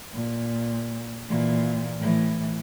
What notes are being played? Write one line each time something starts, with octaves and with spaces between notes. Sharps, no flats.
A#2
A#2 E3
A2 E3